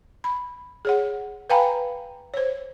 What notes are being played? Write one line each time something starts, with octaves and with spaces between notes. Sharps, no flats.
B5
G#4 C#5 F#5
B4 F5 G5 G#5 A#5 B5
C5 C#5